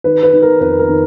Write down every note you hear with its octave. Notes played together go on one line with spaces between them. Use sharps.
D#3 B4
B4
D#3
A#4
F2 B4
A#4
D#3